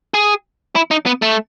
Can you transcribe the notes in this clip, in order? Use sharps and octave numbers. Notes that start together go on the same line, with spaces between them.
G#4
E4
D#4
B3
A3